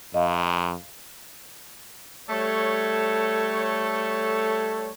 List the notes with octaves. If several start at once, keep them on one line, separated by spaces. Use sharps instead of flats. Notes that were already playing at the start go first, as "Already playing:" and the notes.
F2 D#5 F5
G3 A3 A4 C#5